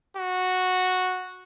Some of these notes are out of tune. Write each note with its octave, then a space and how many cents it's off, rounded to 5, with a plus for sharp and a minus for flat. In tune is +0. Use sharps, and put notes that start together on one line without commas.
F#4 -5